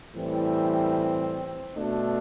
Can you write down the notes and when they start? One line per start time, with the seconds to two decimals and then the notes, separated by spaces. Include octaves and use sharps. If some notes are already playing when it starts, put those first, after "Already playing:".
0.16 A2 E3 G3 C4
1.76 B2 A3 D4